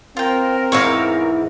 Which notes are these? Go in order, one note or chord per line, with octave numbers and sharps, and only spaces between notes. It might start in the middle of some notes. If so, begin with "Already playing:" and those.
C4 F4 A#4 G5
E2 G#2 E3 C#5 E5 F5